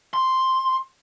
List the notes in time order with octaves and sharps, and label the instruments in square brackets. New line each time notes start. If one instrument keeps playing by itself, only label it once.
[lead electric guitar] C6